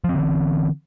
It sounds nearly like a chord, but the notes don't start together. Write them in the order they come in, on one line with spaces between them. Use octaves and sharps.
F3 C4 D3 E3